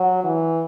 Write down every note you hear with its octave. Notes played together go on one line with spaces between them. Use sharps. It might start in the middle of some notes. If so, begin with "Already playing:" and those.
Already playing: F#3
E3